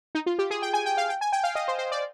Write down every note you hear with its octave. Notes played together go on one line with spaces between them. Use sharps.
D#4
F4
G4
G#4
G5
G#5
G5
F5
G5
G#5
G5
F5
D#5
C5
C5
D5